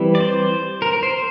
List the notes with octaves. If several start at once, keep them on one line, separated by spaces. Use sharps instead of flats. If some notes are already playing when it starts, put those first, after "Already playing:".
Already playing: E3 G3 C4 E4
D5
C5
A#4
A#4
C5